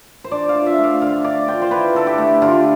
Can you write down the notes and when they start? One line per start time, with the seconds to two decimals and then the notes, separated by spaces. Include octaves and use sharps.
0.24 C5
0.31 D4 D5
0.49 F5
0.55 F4
0.66 E5
0.78 A3
0.84 F5
1.02 D3 F5
1.24 D4 D5
1.48 F4 G5
1.62 C5
1.71 E4 B4
1.95 D3 A4
2.07 G4
2.18 A3
2.42 D3 F4